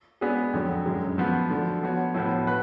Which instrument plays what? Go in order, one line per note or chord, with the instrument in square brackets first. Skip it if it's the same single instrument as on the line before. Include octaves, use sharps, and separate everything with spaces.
[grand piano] G#3 B3 D4 G#4
F2 D3 F#3
F#2 D3 G#3
F3 B3 F#4
D3 F3 A3
F3 B3 F#4 C#5
A2 F3 B3
F#4 B4